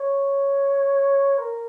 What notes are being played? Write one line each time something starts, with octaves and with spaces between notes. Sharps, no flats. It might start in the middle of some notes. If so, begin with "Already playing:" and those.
Already playing: C#5
A#4